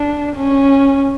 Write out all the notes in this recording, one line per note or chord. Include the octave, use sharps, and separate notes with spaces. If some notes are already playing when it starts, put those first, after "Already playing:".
Already playing: D4
C#4